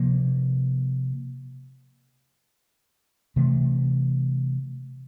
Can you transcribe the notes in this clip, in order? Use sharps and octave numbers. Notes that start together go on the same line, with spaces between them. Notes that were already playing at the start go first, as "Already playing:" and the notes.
Already playing: C3 F3 A#3
C3 E3 A3